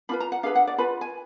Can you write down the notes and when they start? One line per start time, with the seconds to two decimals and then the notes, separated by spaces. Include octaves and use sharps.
0.09 D4 F4 B4 B5
0.20 A#5
0.32 F#5
0.43 D4 G#4 B4 F5
0.55 F#5
0.67 D5
0.78 F4 B4 B5
1.01 G#5